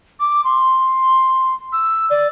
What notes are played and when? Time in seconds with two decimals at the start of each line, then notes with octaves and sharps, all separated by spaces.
0.20 D6
0.44 C6
1.72 E6
2.10 D5